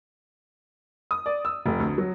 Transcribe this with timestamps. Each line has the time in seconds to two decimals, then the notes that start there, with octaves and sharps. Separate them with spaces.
1.11 D#6
1.26 D5
1.45 E6
1.66 F1
1.80 D2
1.98 F#3